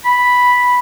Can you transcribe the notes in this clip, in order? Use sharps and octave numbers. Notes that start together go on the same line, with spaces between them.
B5